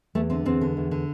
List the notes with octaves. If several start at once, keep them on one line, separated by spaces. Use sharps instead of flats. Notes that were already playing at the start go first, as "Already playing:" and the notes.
E2 A3
D3 C4
E2 C4
D3
E2
D3